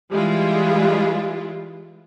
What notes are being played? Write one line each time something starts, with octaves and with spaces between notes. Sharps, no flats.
E3 G3 G#3 E4 F4